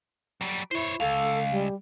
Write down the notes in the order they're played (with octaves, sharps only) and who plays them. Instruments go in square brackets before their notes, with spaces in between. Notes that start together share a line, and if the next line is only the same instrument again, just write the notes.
[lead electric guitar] F#3 G3
[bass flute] E4 [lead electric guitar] C5 C#5
[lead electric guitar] C#2 [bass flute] A4 [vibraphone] F5
[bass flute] G3